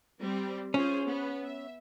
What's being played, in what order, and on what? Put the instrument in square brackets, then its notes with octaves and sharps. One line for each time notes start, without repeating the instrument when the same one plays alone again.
[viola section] G3 C4
[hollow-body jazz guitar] C#4 [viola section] F4 G#4 C5
[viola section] B3
E5